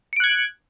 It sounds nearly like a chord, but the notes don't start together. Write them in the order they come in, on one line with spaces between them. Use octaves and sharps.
C#7 D7 F#6 G#6